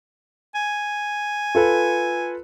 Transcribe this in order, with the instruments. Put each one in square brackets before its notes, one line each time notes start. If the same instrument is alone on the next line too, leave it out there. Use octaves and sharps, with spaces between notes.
[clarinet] G#5
[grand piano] F4 A4 B4